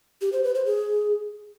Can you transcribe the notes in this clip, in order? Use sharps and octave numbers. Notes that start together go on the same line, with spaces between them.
G4
C5
B4
C5
G#4